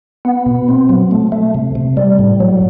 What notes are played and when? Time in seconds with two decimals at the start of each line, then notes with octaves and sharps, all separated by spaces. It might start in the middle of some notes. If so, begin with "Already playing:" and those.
0.25 B3
0.46 B2
0.68 C4
0.89 F#3
1.11 A3
1.32 A3
1.54 C3
1.75 C3
1.97 G3
2.19 A2
2.40 F#3